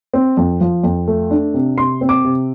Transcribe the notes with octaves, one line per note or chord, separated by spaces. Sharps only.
C4
F2
F3
F2
A3
D4
C3
C3 C6
C4
D6
C3